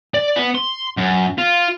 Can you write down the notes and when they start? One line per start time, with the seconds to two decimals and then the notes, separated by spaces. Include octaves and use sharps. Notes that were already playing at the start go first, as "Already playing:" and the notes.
0.14 D5
0.36 B3
0.55 C6
0.97 F#2
1.38 F4